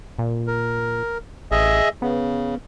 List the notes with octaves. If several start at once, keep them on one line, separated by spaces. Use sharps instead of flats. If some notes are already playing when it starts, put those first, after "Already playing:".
A#2
A#4
A1 G#4 D#5 E5
C#3 B3